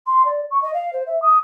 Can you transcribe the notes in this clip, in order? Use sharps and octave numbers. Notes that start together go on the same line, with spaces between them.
C6
D5
C#6
D#5
F5
C5
E5
D#6